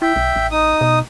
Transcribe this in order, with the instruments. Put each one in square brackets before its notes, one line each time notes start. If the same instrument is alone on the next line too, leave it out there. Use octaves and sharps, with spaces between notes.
[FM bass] E4 [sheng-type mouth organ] E5 G5
[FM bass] B1
A1
[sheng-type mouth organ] D#4 D#6
[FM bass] B2